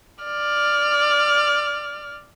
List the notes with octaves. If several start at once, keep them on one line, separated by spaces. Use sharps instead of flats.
D5 F6